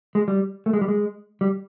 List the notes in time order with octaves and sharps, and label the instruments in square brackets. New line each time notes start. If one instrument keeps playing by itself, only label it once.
[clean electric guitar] G#3
G3
A3
G#3
G3
G#3
G3